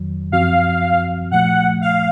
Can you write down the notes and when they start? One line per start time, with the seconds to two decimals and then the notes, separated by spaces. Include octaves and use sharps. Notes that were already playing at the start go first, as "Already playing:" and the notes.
Already playing: F2 D#3 F#3
0.32 F#2 F3 C4 F#4 F5
1.31 A#2 F3 A3 F#5
1.81 F5